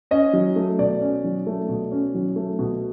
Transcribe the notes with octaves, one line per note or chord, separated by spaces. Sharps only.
C#4 D#5
F#3
A3
B2 D5
C#4
F#3
A3
B2
C#4
F#3
A3
B2